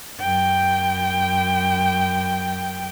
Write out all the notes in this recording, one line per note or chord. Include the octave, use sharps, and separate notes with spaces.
F#2 G5